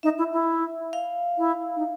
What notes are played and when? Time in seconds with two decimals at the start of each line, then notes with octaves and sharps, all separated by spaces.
0.03 D#4 E5
0.18 E4
0.33 E4
0.93 F5
1.38 E4
1.76 D#4